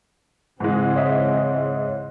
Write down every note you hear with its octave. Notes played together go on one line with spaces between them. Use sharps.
G#2 C#3 E3 G#3 C4
C#5 D#5 E5